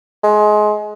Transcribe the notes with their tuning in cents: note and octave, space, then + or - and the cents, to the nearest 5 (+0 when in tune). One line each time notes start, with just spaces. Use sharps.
G#3 +25